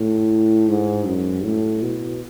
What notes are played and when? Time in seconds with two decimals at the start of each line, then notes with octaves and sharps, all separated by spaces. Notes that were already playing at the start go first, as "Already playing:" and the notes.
Already playing: A2
0.68 G#2
1.06 F#2
1.44 A2
1.82 B2